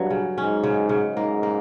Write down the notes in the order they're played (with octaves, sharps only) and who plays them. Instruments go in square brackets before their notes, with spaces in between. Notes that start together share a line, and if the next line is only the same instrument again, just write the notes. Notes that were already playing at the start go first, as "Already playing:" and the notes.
Already playing: [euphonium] G2 [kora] F#3
[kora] C#3
[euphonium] G#2 [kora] C#4
[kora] C#3
C#3
[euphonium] G#2 [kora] A#3
[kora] A#3